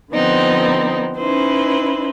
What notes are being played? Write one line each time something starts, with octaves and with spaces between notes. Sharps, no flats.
D3 F3 B3 C4 D#4
C#4 D#4 E4 B4 C5